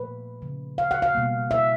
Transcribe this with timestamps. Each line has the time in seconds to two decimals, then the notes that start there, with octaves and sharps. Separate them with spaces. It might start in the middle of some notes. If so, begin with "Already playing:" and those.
Already playing: A#2 F3 A3 B4
0.42 C#3 F3 A3
0.78 F5
0.91 F#5
1.02 F5
1.15 B2 G3 A#3
1.51 E5